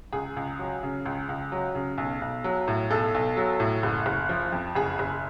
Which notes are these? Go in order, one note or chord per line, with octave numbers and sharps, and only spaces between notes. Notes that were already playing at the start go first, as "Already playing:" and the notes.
C#2 G#4
C#2
F#3
C#3
C#2
C#2
F#3
C#3
B1
B1
F#3
A2
B1 A4
B1
F#3
A2
F#1
F#1
F3
F2
F#1 G#4
F#1